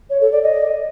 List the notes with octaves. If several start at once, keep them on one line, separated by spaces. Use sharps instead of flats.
C#5
A4
D5
D#5